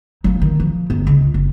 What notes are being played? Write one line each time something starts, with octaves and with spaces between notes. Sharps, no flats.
F#3 A#3
D#3
F3
G1
C#2
F#1